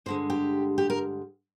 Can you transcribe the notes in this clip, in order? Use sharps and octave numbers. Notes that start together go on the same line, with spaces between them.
G2 D3 G#3 C5
G4
G4
A#4